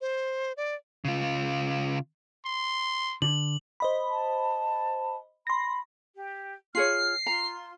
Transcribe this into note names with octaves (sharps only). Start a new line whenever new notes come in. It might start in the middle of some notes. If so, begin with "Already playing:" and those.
C5
D5
C#3 F4
C6
D3 F#7
C5 D#5 B5
A5
B5 C6 A#6
G4
F4 G#4 C#5 F6 C7
F4 A#5 C6